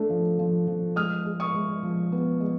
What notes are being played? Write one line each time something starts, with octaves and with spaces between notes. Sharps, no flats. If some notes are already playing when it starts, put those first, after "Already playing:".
Already playing: A3 D4
F3
F3
F3
G#3 D#6 F6
G#3
C#6 D#6
G#3
F3
B3
G#3